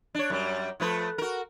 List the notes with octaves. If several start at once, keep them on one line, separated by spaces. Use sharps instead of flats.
D4 C#5
F#2 G3
F3 A3 B4
F#4 A#4